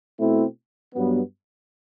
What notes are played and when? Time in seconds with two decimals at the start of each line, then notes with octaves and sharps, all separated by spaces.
0.18 B2 A3 C4 E4
0.94 G2 F#3 B3